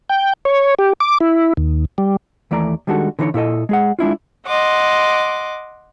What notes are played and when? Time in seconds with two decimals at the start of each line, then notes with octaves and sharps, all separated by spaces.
0.09 G5
0.45 C#5
0.79 G4
1.00 D6
1.20 E4
1.57 D#2
1.98 G3
2.51 D#2 E3 A3 D5 A#5
2.87 D#3 G3 G#3 D4 F#4 A4
3.19 D3 E3 D#4 C5 C#5
3.34 A#2 E4 A4 D#5
3.69 G#3 G#4 F#5
3.99 G#3 D4 E4 F4
4.46 D#5 F#5 C6 D6